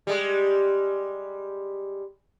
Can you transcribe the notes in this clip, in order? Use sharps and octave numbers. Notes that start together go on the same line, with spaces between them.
G3 G#3